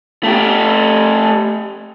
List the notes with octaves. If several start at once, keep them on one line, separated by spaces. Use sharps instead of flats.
A3 G4